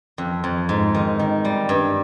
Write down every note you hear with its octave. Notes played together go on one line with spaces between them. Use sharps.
F2
F2
G#2
D#3
D#3
G3
G2